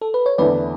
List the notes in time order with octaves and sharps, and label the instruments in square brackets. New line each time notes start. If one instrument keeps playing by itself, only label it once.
[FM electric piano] A4
B4
C#5
[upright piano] E2 D3 A3 E4 [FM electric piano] B4 D5